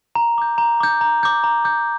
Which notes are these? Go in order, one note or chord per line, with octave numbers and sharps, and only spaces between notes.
A#5
D6 G6
A#5
D6 G6
A#5
D6 G6
A#5
D6 G6